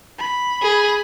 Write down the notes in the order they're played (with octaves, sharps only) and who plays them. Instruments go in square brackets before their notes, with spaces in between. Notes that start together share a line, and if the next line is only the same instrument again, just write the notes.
[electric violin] B5
[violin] G#4